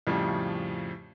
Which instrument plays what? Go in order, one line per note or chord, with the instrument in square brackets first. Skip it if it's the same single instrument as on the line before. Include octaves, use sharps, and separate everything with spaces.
[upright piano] F2 A2 C#3 F3 G3